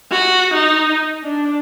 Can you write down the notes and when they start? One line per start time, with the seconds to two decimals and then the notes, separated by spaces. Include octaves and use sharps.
0.11 F#4
0.54 D#4
1.24 D4